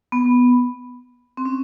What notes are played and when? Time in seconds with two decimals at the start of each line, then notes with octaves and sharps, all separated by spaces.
0.12 B3
1.37 C4
1.45 C#4